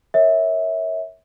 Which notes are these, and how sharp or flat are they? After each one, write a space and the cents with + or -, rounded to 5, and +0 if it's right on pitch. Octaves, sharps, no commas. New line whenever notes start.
A#4 +0 C#5 +0 E5 -20